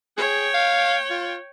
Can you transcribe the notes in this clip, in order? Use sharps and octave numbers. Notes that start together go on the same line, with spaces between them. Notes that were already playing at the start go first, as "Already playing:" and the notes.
G#4 C#5 G5
F5
F4